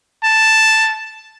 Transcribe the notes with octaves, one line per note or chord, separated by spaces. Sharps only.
A5